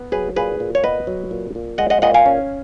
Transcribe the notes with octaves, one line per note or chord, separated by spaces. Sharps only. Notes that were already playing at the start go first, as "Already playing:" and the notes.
Already playing: B3
F#3 G#4 B4
A#2 G#4 B4
A#2
C#5
B3 B4 D#5
F#3
A#2
A#2
G#3 D#5 F#5
D#5 F#5
A#2 D#5 F#5
F5 G#5
C#4